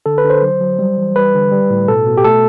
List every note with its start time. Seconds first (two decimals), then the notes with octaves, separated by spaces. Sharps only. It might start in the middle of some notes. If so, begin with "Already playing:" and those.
0.06 D3 A4
0.18 B4
0.25 D3
0.30 C5
0.42 F#3
0.61 F#3
0.79 G3
0.97 E3
1.16 G3 B4
1.34 D3
1.52 G3
1.70 A2
1.88 B2 A4
2.07 B2
2.17 G4
2.24 A3 A4